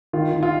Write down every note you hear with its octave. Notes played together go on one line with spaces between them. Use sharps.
D#3 F4
D#3
F4